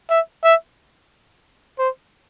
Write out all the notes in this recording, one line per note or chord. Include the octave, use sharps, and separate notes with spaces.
E5
E5
C5